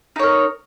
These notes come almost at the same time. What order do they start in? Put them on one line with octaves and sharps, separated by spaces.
D#4 C#5 A#4